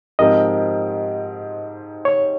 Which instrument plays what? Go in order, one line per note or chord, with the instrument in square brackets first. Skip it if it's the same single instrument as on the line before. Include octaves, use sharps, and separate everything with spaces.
[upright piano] G#2 F3 C4 G4 A#4 [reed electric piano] D#5
[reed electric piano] C#5